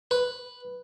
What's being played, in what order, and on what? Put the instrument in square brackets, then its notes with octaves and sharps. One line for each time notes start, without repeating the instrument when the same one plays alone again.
[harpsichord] B4